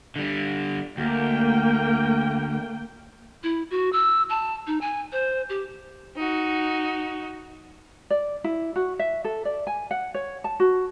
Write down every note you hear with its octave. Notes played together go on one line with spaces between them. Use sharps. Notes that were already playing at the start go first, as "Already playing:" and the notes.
D3 G3
D2 A3 A#3 G5
E4
F#4
E6
A5
D#4
G#5
C5
G4
D#4 F#4
D5
E4
F#4
E5
A4
D5
G#5
F#5
C#5
A5
F#4